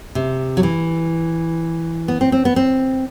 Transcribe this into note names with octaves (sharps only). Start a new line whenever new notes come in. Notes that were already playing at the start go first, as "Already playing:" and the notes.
C3
F#3
E3
B3
C4
C4
B3
C4